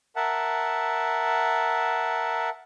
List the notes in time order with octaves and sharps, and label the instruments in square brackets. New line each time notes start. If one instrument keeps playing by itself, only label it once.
[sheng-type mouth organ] A#4 E5 F#5 A5